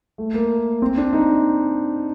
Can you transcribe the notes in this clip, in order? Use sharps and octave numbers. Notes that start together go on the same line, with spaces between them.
A3
A#3
C4
D4
D#4